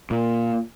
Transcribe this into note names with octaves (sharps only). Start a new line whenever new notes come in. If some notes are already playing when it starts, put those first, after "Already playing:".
A#2